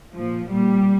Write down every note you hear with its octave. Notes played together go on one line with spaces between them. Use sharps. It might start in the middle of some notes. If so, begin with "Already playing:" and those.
A#2 F3
A#2 G3